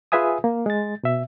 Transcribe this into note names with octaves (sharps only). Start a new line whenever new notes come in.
F4 G#4 B4 E5 G#5 D#6
A#3
G#3 A6
B2 E5